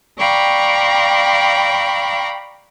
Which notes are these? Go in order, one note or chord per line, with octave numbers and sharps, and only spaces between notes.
D5 F5 G5 A#5 B5 C#6